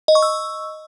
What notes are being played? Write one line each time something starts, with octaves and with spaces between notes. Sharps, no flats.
D#5
C#6
E6